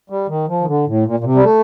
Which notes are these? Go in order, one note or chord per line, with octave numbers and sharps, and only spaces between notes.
G3
D#3
F3
D#3
D3
A2
A#2
A#2
C3
G3
A3